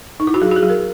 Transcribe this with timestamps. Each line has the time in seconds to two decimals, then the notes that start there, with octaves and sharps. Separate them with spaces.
0.20 D#4
0.27 E4
0.34 F#4
0.41 F#3 G#4
0.51 F#4
0.56 G#4
0.63 F#3
0.70 A#4